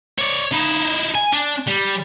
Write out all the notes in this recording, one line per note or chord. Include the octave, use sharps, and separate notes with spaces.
C#5 D5
D#4 E4
G#5
D4
G3